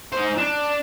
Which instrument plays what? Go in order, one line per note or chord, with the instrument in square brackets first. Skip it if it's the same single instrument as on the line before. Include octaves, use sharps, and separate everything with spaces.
[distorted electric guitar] D#4 C5
D4